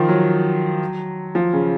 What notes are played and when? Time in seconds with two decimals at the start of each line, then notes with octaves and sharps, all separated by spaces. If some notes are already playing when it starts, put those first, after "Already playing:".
Already playing: D#3 F3
0.09 F#3
1.35 F3
1.53 C#3